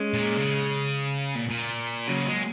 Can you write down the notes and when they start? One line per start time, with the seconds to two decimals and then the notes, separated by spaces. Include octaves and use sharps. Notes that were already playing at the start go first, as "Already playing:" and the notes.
Already playing: G#3 C#4
0.14 A#2
0.38 C#3
1.35 A#2
1.50 A#2
2.07 C#3 F#3 A#3
2.26 G#3